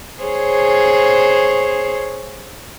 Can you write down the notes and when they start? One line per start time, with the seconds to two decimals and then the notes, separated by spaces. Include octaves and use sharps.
0.23 G#4 C5 C#5